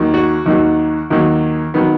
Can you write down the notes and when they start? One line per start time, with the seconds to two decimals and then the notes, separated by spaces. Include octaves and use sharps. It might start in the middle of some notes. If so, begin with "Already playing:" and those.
Already playing: D#2 D#3 F#3
0.14 F#4
0.46 D#2 D#3 F#3
1.10 D#2 D#3 F#3
1.74 D#3 F#3 B3